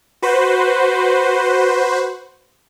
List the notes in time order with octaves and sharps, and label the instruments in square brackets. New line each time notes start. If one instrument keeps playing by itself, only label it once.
[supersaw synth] F#4 B4 C5